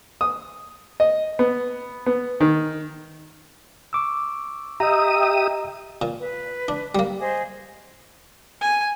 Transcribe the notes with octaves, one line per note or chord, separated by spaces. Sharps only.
D#6
D#5
B3
B3
D#3
C#6 D6 E6
G4 D#5 E5 A#5 D#6
A#2
B4
D4
G3 A#3
G#4 C5 D#5
G#5